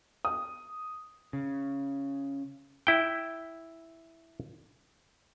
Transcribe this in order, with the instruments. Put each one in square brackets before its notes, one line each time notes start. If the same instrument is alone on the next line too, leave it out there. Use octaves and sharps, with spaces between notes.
[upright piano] D#6
[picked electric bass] C#3
[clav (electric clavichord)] E4 G5